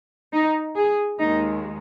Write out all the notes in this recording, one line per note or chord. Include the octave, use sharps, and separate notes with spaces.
D#4
G#4
D#2 D#3 G#3 D#4